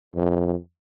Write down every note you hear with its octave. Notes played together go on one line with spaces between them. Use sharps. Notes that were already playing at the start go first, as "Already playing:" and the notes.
F2